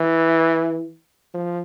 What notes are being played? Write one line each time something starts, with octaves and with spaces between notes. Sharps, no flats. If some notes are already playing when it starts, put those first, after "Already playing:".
Already playing: E3
F3